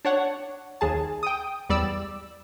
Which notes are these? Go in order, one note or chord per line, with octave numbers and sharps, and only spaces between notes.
D4 C#5 F#5
D#2 G#4 A5
G5 D#6
E2 G3 D5 E6